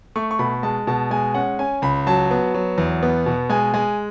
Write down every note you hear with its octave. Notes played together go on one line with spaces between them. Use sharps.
A3 C#6
C#6
B2 B5
G#3 A5
B2 A5
G#3 G#5
C#4 F#5
C#4 G#5
C#2 B5
F#3 A5
B3
F#3
E2
B3
B2
G#3 G#5
G#3 G#5